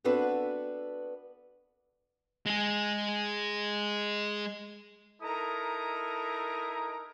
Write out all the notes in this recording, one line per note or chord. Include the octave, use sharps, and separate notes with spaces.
B3 C4 D4 F#4 A4 B4
G#3 G#4
D#4 E4 A4 A#4 A#5 D#6